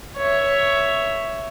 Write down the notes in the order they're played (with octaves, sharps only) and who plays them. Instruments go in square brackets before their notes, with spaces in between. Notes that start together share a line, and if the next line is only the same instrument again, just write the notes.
[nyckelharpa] C#5 E5